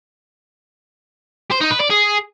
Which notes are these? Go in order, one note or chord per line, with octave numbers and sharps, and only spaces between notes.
C5
D#4
B4
D5
G#4